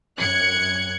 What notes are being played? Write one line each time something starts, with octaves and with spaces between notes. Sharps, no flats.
F#2 F#6 G#6 C#7